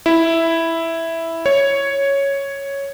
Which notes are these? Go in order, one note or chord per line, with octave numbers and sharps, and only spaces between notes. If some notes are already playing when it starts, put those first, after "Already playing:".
E4
C#5